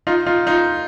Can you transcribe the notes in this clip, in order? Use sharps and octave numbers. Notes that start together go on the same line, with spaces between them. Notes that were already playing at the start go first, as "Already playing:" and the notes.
D#4 F4
D#4 F4
D#4 F4